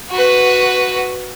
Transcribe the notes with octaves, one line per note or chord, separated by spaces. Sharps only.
F#4 B4